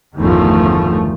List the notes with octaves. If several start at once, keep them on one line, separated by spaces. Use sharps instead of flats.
G1 E2 A2 D#3 F3 A3